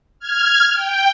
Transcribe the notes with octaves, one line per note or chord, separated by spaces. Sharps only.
F6 G#6
G5